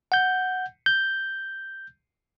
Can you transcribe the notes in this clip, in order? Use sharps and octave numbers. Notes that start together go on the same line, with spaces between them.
F#5 G6
G6